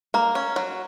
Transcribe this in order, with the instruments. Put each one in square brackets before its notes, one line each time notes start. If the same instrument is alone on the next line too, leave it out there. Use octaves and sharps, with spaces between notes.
[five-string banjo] A#3 [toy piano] A#5
[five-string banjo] C#4
F#3